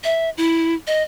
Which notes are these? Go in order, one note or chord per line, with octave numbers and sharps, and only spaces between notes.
E5
E4
D#5